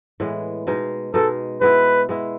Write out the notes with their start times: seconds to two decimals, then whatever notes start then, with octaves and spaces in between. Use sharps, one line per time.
0.20 A2 E3 G#3 B3
0.67 B2 G#3 D#4
1.14 B2 G#3 D#4 A4
1.61 G#3 B3 E4 B4
2.09 G#3 B3 E4